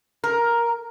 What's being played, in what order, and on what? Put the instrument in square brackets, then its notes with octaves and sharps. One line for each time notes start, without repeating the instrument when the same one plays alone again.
[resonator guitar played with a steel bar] A#4